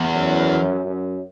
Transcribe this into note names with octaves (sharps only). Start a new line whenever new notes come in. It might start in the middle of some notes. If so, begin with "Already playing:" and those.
Already playing: E2
F#2
F#2